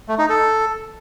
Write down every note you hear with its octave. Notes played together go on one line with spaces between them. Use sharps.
A3
D#4
A4